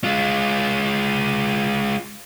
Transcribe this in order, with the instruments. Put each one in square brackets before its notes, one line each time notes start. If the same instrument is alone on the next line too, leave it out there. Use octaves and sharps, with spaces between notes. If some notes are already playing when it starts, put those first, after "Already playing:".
[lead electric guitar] G#3 F4